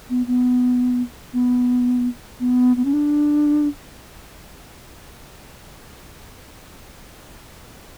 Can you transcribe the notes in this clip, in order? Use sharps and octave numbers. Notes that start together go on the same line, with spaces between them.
B3
B3
B3
B3
B3
C#4
D4